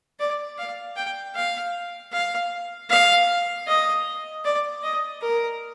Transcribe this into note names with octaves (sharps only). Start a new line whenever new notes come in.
D5
F5
G5
F5
F5
F5
D#5
D5
D#5
A#4